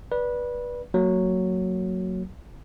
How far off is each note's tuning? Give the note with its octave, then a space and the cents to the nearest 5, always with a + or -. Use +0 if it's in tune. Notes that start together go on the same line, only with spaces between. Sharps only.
B4 -20 D5 +0
F#3 +0 A#3 -20